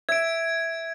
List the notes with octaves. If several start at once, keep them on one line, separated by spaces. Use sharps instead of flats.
E5 G#6 D7